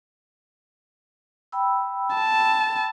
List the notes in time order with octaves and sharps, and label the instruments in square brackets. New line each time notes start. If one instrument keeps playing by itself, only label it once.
[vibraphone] G5 B5 E6
[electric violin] A5